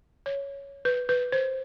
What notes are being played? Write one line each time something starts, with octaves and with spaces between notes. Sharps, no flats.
C#5
B4
B4
C5